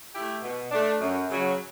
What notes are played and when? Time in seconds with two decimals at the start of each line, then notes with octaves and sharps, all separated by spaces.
0.13 A3 E4 G4
0.42 B2
0.71 A3 D4
1.00 F#2
1.29 C#3 F#3